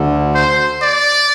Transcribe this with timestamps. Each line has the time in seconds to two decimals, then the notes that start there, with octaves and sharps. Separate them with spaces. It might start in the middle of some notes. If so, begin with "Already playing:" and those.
Already playing: D2 D3
0.34 C5
0.82 D5